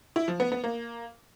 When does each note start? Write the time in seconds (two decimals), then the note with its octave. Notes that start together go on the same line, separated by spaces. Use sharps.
0.16 E4
0.28 F3
0.40 B3
0.52 B3
0.64 A#3